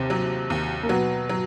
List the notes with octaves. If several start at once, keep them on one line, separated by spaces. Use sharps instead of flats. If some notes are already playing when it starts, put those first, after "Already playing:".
Already playing: D#2 C3 C4
F#3
D#2
A#3
B2 F#3 B3
F#3